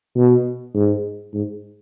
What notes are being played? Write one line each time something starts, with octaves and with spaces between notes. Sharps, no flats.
B2
G#2
G#2